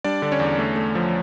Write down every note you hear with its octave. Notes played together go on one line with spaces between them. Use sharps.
G3 D4 D5
D3
C#4 C#5
E2
A3
A3
F3